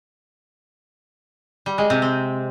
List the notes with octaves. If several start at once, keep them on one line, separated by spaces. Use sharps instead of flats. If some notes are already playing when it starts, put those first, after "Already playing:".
G3
G#3
C3
C4